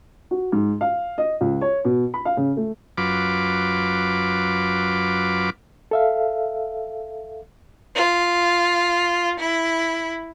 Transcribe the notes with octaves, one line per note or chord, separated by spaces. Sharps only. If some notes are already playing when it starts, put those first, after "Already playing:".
F#4
G#2
F5
D#5
C#2
C#5
B2
B5
F5
C#3
A3
F#2 F4 B4 D6
A4 E5 F5
F4
E4